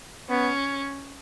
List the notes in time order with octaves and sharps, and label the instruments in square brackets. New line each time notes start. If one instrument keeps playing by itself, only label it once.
[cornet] B3 [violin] C#4